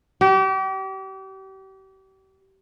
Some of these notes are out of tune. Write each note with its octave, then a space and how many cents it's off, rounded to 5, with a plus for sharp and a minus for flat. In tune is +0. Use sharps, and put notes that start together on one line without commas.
G4 -35